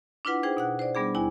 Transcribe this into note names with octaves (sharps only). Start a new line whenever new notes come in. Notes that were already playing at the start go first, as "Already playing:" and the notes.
D4 E4 F4 B4 F#5
D#4 G#4 C5 G5
B2 F#5 F#6
C5 D5
G3 B3 D4 G#4
D#2 E4 G#5